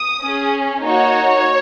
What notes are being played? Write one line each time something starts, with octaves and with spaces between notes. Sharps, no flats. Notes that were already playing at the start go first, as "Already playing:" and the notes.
Already playing: D#6
C#4 G#4
A#3 D#4 F#4 C#5